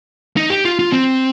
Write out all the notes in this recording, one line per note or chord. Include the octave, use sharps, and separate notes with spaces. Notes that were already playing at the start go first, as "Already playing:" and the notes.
D#4
G4
F4
F4
C4